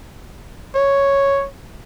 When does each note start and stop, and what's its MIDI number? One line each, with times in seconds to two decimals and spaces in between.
0.75 1.46 73